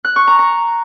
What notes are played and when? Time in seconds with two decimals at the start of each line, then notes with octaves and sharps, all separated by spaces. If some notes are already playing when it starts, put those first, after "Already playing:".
0.05 F#6
0.16 C#6
0.27 A#5
0.39 A#5